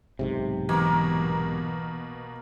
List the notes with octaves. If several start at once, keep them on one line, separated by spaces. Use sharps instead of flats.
B1 G#2 C3
B2 E3 A#3 A#4